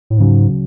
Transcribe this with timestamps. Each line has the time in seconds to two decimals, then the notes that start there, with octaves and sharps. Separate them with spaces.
0.10 A2
0.18 D2 G#2 C#3 F#3